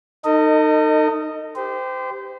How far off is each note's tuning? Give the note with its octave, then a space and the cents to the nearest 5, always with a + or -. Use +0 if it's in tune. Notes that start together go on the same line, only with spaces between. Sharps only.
D#4 -15 A4 +45 D#5 +0
G4 +5 C5 -30